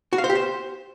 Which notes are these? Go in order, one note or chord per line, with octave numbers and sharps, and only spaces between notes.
F#4
F5
C5
G4
C5